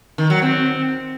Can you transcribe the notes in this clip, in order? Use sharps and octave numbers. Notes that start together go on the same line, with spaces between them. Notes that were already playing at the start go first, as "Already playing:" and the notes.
D#3
F#3
C4